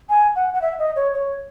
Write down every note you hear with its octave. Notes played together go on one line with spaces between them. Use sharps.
G#5
F#5
F#5
E5
D#5
C#5
C#5